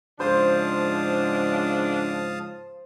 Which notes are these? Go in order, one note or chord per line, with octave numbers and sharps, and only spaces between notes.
G#2 C#3 F3 D4 C5 F5 A5 D#6